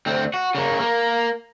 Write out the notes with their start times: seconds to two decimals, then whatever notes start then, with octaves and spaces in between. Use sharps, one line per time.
0.06 D2 C4
0.34 F#4
0.55 C#3 A#3
0.80 A#3